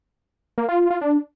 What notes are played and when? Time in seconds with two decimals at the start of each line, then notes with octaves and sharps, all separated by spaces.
0.58 A#3
0.69 F4
0.80 F4
0.90 F4
1.01 D4